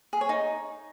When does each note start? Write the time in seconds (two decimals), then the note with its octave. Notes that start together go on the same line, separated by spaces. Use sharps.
0.13 G#4
0.21 C#5
0.29 D#4